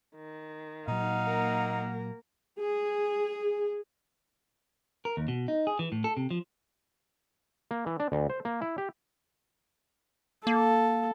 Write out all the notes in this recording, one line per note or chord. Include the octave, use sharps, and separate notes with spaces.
D#3
A#2 F#3 D#4 F5 F#5
A#3 A#4
G#4
A#4
D#2
B2
D#4
G#4
E3
A2
A4
C3
F3
A#3
E3
D4
D2
C5
A#3
E4
G4
A#3 A4